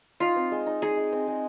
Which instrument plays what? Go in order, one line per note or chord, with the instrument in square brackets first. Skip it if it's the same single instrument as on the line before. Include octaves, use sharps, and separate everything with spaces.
[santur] D#4 [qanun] F4
[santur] C4
G#3
D#4
[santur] D#4 [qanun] G#4
[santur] G#3
C4
G#3